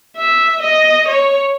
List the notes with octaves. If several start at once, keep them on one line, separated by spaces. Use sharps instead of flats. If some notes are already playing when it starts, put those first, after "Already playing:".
E5
D#5
C#5